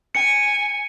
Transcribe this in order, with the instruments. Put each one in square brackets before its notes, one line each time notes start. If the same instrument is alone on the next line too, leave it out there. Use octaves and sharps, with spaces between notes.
[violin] G#5 [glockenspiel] C#7